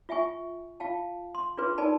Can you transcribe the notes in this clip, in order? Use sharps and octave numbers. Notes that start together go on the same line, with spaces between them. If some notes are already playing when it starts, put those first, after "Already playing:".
F4 E5 G5 G#5 C#6
F4 F5 G5 A5
C6
D4 F4 G#4 B4 C6
D#4 A#4 D5 G#5 A5 B5